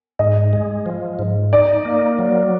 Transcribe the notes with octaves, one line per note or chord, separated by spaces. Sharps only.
G#2 D#5
G#3
F3
G#2
D#4 D5
A#3
F#3